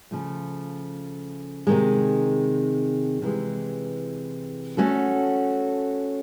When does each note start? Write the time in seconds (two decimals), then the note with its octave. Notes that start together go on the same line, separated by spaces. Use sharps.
0.11 C#3 F3 A3
1.67 C3 D#3 G#3
3.22 C3 E3 G#3
4.77 A3 C#4 F#4 A4